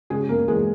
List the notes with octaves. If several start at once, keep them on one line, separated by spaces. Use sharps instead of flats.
C#3 G#3 G#4
A#3 A#4
E2 G#3 G#4